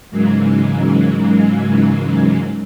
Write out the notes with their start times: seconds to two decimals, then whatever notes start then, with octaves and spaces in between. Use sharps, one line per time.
0.10 G#2 C#3 E3 F#3 G#3 A#3